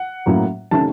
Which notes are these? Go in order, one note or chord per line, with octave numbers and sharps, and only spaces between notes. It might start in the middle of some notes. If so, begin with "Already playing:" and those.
Already playing: F#5
A2 F#3 A#3 C#4
C3 D#3 A3 C#4 A5